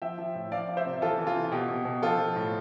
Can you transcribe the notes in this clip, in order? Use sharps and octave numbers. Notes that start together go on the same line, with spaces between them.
F3 E5 G5
F3
A2
F3 D5 F5
F3
C5 E5
C3
E3 F4 A4
E3
F4
C3
B2 G4
B2
B2
F3 F4 A4
F3
A2